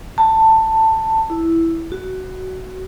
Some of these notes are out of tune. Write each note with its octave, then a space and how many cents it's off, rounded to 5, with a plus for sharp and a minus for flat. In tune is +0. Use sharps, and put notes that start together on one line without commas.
A5 +15
E4 +0
F#4 +15